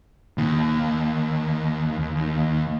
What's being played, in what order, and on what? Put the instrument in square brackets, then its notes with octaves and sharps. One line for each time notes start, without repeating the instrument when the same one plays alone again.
[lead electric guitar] D#2 D#3